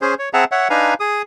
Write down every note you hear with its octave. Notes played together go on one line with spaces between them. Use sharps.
C#4 G#4 C5
C#5
C4 G#4 E5 F#5 A5 A#5
C#5 E5 F#5
D4 D#4 B4 F5 G#5 A#5
G#4 D#6